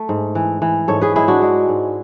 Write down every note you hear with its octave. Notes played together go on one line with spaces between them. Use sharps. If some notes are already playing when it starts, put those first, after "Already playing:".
Already playing: A3
G#2
E3
E3
G#2 A4 C#5
G#4 B4
G#3 E4 G#4
D4 F#4
G#3
G#2